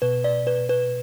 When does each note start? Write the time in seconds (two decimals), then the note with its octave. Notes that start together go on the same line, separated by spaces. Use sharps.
0.02 B2 B4
0.24 D5
0.47 B4
0.69 B4